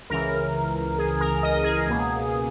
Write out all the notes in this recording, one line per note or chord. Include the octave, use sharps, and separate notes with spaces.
C#2 C#3 E3 A#4
G#4
A#4
D#5
G#4
C#2 B2 A#3